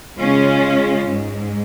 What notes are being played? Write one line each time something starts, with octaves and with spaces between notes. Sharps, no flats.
C#3 G#3 C#4 F4
G#2 G#3